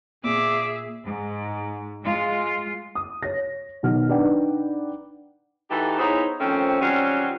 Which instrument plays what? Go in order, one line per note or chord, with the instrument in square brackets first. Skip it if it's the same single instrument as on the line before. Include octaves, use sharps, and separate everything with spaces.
[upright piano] A#2 [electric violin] G#4 E5 [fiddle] D6
[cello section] G#2
G#3 F4
[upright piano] D#6
C#5 A#6
B2 D#3 F#3 F6
D4 D#4 B4 D5 F#5 G5
[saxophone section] E3 D#4 F#4 G4 A4
B3 D#4 E4 G#4 C5 C#5
D#3 F3 A3 C4 C#4
D#3 F#3 G3 C4 C#4 F4